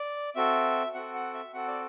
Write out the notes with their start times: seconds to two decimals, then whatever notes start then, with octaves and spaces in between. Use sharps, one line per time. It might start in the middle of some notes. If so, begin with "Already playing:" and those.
Already playing: D5
0.35 C4 F#4 A4 E5
0.94 C4 F#4 A4 F#5
1.14 F#5
1.34 E5
1.53 C4 F#4 A4 F#5
1.68 D5